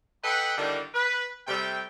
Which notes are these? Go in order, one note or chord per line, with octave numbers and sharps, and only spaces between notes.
A4 B4 D#5 F#5 G5 B5
D3 D#3 G3 A#3 D4 E4
B4
C3 G3 A3 G5